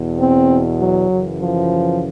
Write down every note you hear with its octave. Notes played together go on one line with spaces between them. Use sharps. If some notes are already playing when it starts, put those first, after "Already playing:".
Already playing: E2 B2
C4
F#3
F#2 C#3 E3
F3